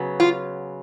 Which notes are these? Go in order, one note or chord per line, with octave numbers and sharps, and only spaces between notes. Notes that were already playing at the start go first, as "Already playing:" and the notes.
Already playing: C#3 F#3 B3
F4